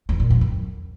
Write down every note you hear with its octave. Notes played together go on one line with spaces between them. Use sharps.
E2
A#2
F2
F#2